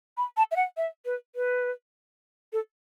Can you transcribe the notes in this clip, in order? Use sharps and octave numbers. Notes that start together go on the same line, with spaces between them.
B5
A5
E5
F#5
E5
B4
B4
A4